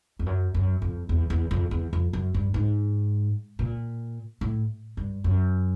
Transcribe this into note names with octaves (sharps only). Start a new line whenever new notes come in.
F2
F#2
F#2
F2
E2
E2
F2
E2
F2
F#2
G2
G#2
A#2
A2
G2
F#2